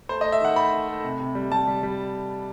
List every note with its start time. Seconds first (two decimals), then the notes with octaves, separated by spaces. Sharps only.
0.09 A3 C5
0.21 A3 D#5
0.32 E5
0.41 D#3 F#5
0.56 A3 B5
0.72 A3
0.88 A3
1.04 C3
1.20 C3
1.35 G3
1.51 G3 A5
1.67 G3
1.83 G3